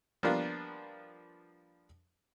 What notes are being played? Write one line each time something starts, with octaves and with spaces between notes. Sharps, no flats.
F3 G3 A#3 B3 D4 F4